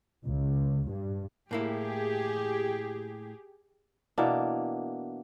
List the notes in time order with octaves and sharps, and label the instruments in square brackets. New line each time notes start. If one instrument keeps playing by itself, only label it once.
[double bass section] C#2
G2
[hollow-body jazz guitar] A2 A#3 E4 [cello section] G4 G#4
[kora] B2 E3 A#3 D4